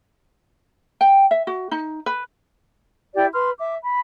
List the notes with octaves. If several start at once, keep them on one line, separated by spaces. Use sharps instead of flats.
G5
E5
F#4
D#4
B4
E4 G4 D5 G5
B4 C6 F6
E5 D6
B5